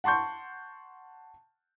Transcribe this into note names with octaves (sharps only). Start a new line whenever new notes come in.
F#5 A5 C6 C#6 G6